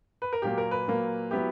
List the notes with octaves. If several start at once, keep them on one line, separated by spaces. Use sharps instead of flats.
B4
A#4
A#2 F#3 A#3 G4
A#4
B4
A#2 F#3 A#3
F#3 B3 E4 G4